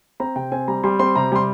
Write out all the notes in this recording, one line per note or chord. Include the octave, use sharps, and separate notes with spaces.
C4 A#5
C3 G5
C4 G#5
G3 A#5
G3 C6
C4 C6
C3 A#5
G3 C6